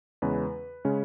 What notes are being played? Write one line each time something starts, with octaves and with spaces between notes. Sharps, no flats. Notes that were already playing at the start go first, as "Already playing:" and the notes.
E2 C#3 G#3 C#4 B4
C#3 G#3 C#4